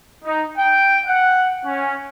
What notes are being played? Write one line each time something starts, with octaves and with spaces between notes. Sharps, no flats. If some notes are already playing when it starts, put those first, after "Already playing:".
D#4
G5
F#5
C#4